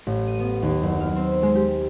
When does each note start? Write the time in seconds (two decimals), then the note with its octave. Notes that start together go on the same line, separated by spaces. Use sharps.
0.07 A1
0.27 D#7
0.39 B3
0.62 D#2
0.82 F#1
1.00 F6
1.16 C4
1.43 G#3
1.55 G4